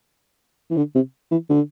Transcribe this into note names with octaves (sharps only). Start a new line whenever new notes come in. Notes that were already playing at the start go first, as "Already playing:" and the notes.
E3
D3
C3
E3
D3